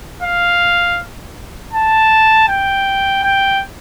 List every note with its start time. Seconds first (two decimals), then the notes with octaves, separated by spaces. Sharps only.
0.23 F5
1.73 A5
2.48 G5
3.23 G5